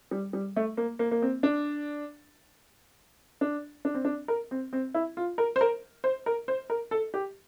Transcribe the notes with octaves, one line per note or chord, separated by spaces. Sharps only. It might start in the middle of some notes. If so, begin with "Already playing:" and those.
G3
G3
A3
A#3
A#3
A#3
C4
D4
D4
D4
C4
D4
A#4
C4
C4
E4
F4
A#4
C5
A#4
C5
A#4
C5
A#4
A4
G4